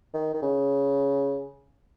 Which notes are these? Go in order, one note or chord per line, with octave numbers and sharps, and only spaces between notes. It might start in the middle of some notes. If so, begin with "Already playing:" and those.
D#3
D#3
C#3